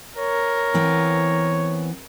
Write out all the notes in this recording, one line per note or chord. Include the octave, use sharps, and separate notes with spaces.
A#4 C#5
E3 B3 C4